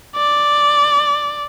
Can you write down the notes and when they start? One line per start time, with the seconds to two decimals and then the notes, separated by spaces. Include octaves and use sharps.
0.16 D5